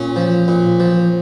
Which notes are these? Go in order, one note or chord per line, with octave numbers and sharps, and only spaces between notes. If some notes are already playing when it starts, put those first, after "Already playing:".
Already playing: A#2 C#4
F3
A#2
F3